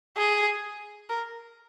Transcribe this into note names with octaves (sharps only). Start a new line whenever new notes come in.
G#4
A#4